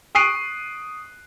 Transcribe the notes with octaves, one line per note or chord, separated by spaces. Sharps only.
C#6 D#6 F#6 C7 D7 D#7